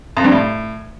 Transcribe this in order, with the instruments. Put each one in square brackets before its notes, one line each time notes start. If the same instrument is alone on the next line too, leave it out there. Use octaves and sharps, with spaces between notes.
[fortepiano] F2
G2
A2